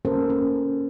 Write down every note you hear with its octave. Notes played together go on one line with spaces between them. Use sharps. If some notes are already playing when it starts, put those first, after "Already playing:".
A#3 C#4 A4 A#4 C5
C#4